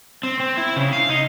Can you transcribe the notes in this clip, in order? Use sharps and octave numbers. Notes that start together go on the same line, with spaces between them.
C4
C4
E4
C#3
F5
D#4